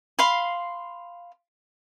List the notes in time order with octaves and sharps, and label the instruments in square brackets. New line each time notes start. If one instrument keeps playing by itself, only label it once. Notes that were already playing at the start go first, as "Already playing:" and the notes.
[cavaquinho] F5 B5 C6